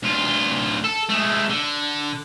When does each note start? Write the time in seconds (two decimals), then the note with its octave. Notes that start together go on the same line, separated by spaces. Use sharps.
0.03 D2 F4
0.84 A4
1.09 G#3 A3
1.50 D3